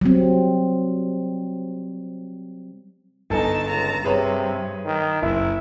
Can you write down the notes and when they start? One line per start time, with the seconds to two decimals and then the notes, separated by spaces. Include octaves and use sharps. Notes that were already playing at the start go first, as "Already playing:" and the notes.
0.01 F#3 G3 C4
3.30 G1 D#4 A4 G#5 A5
3.67 C#2 A5 A#5
4.04 G2 C3 G#4 B4 C#5
4.85 D#3
5.22 F#1 E4